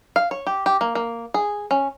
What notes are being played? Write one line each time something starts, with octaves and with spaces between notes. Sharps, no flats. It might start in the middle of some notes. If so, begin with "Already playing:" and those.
F5
C#5
G4
G4
A#3
A#3
G#4
C#4